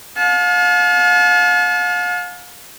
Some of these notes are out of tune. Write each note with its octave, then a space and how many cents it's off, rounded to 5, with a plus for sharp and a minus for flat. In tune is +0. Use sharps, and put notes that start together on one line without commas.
F5 +40 A5 -35